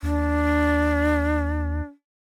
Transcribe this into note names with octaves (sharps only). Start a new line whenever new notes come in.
D#2 D4